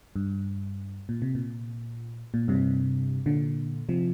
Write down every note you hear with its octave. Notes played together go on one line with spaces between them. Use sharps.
G2
A#2
C3
A#2
A#2
G2 C3
A#2 D3
C3 F3